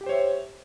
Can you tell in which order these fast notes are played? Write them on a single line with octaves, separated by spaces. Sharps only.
G4 G5 C5 C#5 E5